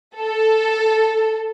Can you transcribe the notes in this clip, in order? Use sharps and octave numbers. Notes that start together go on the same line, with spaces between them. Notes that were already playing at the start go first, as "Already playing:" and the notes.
A4